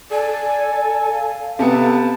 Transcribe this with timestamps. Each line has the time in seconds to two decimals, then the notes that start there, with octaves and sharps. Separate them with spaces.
0.11 A4 D5 G#5
1.11 F5
1.59 C3 B3 A4 A5